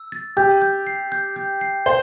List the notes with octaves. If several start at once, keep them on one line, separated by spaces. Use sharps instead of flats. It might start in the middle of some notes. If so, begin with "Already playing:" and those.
Already playing: E6
A6
G4 G6
G6
C7
G6
G6
C7
C5 G7